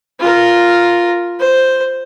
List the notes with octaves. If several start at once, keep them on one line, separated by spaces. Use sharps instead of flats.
F4 A#4
C5